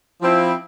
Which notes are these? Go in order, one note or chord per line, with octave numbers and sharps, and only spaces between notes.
F3 C4 E4